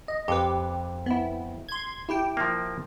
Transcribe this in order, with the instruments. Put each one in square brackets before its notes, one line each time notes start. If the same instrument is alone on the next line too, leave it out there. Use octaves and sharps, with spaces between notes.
[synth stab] D#5
[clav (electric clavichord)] F2 [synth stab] G4 B4
[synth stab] B3 E4
C6 G#6
E4 G4 G5
[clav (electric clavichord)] F3 A#3